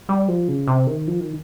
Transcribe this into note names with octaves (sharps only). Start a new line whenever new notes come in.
G3
F3
C#3
C3
D#3
F3
D#3